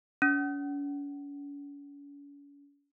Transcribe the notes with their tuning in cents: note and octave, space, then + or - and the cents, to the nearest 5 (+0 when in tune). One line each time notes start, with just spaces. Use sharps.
C#4 +45